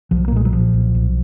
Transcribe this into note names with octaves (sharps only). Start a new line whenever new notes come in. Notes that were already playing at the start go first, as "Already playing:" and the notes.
B1 F3
A#3
A#2 G#3
F#3
A#2 F3
B1
B1